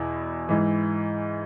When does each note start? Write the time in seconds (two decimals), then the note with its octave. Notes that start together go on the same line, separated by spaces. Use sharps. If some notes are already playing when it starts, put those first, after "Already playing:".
Already playing: E2 B2 E4
0.49 G#2 E3